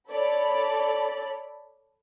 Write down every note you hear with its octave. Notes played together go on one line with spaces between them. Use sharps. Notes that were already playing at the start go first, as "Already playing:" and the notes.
A4 C#5 D5 B5